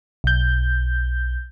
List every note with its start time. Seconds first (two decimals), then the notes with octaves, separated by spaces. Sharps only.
0.24 B1 G6